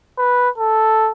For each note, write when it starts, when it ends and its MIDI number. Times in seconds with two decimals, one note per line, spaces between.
0.18 0.50 71
0.58 1.12 69